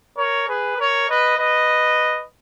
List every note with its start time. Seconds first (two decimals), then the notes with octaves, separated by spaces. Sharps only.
0.17 A#4 C#5
0.48 G#4 B4
0.77 A#4 C#5
1.08 B4 D#5
1.38 B4 D#5